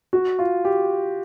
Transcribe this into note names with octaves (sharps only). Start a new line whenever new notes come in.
F#4
F4
G4